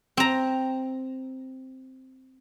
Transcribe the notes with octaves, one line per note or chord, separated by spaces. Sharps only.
C4 A#5